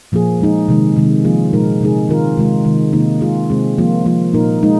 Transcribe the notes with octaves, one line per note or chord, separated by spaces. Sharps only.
A#2 F3 A#3 G#4
G#3 D#4 G#4
C3 D#3 G#3
C3 D#3 G#3
F3 A#3 F4 G#4
A#2 G#3 D#4 A#4
C3 G#3 D#4 G#4
D#3 C4 F4 A#4
C3 D#3 G#3 F4
C3 D#3 G#3
C3 D#3 A#3 D#4
C3 G#3 F4 G#4
C3 G#3 C4 G#4
F3 A#3 F4
F3 A#3 F4
A#2 A#3 D#4 A#4
G#3 D#4